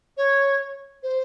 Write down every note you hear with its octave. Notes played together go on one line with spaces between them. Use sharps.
C#5
C5